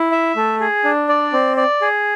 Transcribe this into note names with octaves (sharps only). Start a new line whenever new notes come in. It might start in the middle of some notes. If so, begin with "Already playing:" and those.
Already playing: E4
E5
A3
G#4
D4
D5
C4
D5
G#4